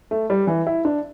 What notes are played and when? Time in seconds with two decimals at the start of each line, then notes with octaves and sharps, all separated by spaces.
0.11 A3
0.30 G3
0.47 E3
0.67 E4
0.85 D4